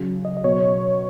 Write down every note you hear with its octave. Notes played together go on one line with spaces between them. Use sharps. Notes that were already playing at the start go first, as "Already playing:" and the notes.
Already playing: C#3 F#3
D#5
D#5
B2 F#3 C#5